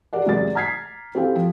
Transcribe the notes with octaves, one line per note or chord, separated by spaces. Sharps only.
G4 G#4 A#4 D5 F#5
E2 C3 F#3 G#3 D5 A6
A#5 F6 G#6 B6 C7
C4 E4 G4 A4 F5 G5
F3